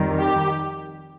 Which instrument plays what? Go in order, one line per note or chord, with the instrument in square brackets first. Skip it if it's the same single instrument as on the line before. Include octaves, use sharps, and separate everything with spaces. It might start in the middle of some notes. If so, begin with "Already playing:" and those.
Already playing: [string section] F2 D#3 G3
G4